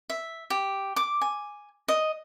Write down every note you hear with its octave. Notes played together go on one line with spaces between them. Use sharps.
E5
G4
D6
G#5
D#5